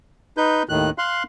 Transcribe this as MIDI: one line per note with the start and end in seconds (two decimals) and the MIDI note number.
0.37 0.63 63
0.37 0.63 71
0.37 0.63 91
0.69 0.90 39
0.69 0.90 45
0.69 0.90 51
0.69 0.90 90
0.98 1.23 77
0.98 1.23 84
0.98 1.23 90